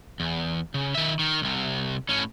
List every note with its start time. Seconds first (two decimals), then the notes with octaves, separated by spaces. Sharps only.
0.20 E2
0.74 C#3
0.95 D#3 E5
1.19 D#3
1.42 C2 C3
2.09 A2 C#4